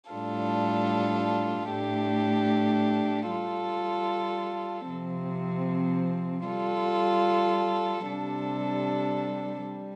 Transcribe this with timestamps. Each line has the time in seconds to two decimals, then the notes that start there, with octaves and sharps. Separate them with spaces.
0.10 A2 G3 D4 F4 A4
1.70 A2 A3 D4 G4
3.29 G3 F4 A4
4.88 C3 F3 C4
6.47 G3 F4 A4
8.06 C3 G3 D4 A4
9.65 G3